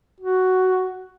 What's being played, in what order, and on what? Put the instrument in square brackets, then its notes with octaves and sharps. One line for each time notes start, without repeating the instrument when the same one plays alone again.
[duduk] F#4